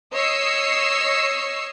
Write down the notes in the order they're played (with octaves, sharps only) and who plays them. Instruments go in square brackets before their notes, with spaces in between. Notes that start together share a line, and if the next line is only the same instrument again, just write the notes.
[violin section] C#5 D#5 D#6 E6 C7 C#7